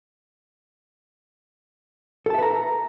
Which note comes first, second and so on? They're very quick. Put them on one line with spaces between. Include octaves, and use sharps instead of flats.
A4 A5 E5 B4 A#5